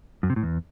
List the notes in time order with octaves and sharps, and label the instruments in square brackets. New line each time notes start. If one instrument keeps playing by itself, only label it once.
[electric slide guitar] F#2
C3
A2
E2